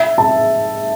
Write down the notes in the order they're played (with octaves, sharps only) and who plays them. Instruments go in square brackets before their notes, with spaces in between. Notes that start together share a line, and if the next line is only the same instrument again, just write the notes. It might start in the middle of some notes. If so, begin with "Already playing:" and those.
Already playing: [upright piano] E5
A5